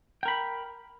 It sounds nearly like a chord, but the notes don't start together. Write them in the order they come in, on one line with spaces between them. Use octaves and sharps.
G5 A#4 B5